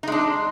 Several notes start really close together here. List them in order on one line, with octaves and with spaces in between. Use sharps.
D#4 G#3 D4